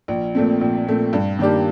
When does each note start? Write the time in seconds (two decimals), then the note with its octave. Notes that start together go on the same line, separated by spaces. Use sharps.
0.08 A#1
0.35 A#2 A3 C4
0.61 A#1
0.87 A#2 A3 C4
1.13 G2
1.39 D#3 A#3 D4 G4